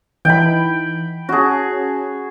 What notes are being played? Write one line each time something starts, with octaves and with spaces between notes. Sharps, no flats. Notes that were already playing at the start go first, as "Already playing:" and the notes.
E3 D#4 G5 B5
C#4 F#4 G#4 A5